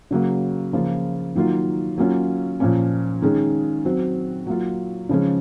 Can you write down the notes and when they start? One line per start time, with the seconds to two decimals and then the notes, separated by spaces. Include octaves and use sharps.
0.11 C#3 F#3 A#3
0.73 C#3 F3 A#3 F4
1.35 D#3 F#3 A#3 F4
1.98 F#3 A#3 C#4 F4
2.60 A#2 F3 A#3 C#4
3.22 D#3 G#3 C#4
3.85 F#3 C4 F#4
4.47 F#3 A#3 F4
5.09 C#3 F3 G#3 C#4